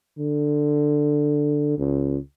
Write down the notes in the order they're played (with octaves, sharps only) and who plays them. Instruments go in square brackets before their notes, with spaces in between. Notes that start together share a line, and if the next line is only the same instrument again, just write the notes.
[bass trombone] D3
C#2